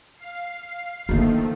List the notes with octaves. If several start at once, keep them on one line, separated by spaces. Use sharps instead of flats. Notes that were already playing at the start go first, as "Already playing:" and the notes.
F5 C7
D3 D#3 F3 A3 A#3